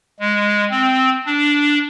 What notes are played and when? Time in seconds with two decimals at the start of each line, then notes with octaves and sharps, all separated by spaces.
0.20 G#3
0.70 C4
1.26 D4